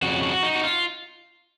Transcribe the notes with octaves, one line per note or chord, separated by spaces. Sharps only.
F2 C#3 F#4
F#4
D#4
F#4
F4